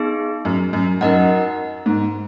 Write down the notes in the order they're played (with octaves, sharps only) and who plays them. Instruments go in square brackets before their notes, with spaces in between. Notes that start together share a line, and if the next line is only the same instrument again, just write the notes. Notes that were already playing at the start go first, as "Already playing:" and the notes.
Already playing: [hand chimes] B3 D#4 G#4
[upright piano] F#2
F#2
[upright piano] F#2 [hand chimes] D#4 A#4 D#5 F#5
[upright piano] G#2